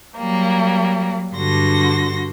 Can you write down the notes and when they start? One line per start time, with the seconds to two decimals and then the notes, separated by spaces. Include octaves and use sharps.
0.19 F#3 G3 A#3
1.34 G2 D3 F#4 C6 A#6